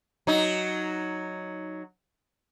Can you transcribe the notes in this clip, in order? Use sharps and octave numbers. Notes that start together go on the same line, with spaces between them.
F#3 D#4